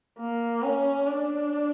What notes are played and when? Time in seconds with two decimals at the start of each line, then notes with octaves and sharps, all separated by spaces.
0.19 A#3
0.63 C#4
1.07 D4